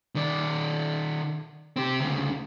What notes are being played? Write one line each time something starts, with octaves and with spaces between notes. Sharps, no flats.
D#3 D5
C4 G4
D2 C#3